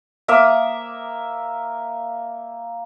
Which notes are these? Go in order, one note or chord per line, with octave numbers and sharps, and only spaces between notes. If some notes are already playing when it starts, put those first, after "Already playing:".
A#3 A#4 E5 D#6